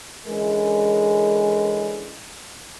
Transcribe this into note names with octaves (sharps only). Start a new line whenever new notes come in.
D3 E3 G#3 C#4 G#4 A#4